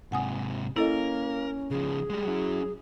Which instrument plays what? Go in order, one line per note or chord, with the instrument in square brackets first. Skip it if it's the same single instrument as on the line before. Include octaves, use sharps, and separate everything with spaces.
[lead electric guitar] G#2 C3 [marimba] F#5 G#5 D#6
[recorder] A#3 [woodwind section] C#4 [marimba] E4 A4 D#5 [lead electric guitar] A#4
[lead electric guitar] C#3 F3 [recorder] G#4
[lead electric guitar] G3 G#3
[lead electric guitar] F#3 C#4 [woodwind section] E4 F#4